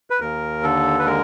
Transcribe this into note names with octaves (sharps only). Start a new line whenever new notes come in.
B4
D#2 A#4
D3 A4
B4
G#3 A#4